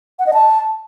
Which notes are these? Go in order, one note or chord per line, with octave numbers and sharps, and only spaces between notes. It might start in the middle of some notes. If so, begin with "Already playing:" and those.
F#5
D#5
A5